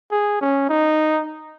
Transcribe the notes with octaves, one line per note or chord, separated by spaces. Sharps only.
G#4
C#4
D#4